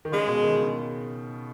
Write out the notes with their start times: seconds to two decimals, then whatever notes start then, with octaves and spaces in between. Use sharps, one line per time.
0.05 D#3
0.12 C#3 G#3
0.28 B2
0.43 D#3
0.58 C#3